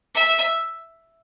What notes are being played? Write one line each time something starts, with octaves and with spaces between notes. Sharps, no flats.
E5